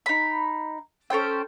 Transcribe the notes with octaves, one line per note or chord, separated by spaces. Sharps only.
D#4 B5
C#4 A4 C5 G5